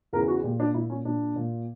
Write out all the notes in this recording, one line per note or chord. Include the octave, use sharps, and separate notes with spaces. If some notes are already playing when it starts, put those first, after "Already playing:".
E2 C#3 E3 A#4
F#4
A#2 G4
D4
A#2 E4
C#4
A#2 D4
A#2